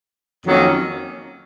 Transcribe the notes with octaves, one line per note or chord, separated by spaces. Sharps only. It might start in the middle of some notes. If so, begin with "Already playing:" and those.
F2 D#3 F#3 A#3 C#4